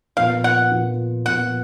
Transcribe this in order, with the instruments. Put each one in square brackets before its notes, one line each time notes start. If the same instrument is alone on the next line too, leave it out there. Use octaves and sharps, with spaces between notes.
[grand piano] A#2 F3 B3 F4 [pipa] F5
[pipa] F#5
[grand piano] A#2 F3 B3 F4
[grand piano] A#2 F3 B3 F4 [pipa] F#5